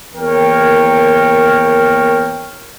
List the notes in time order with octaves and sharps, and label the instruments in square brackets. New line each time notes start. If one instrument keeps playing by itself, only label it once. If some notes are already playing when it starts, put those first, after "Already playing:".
[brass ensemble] E2 A#3 A#4 C#5 G5